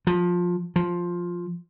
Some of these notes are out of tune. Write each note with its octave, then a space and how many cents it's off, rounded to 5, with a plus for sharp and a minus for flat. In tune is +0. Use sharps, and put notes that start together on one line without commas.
F3 +20
F3 +5